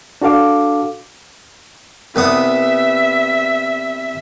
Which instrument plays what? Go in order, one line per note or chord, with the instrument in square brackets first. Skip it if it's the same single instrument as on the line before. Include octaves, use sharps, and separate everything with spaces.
[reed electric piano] D4 F#4 A4 F5 D6
[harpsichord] C2 B3 D#6 [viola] E5